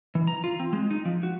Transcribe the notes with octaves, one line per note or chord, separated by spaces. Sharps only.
E3
A#5
F4
C4
G#3
D#4
F3
F#4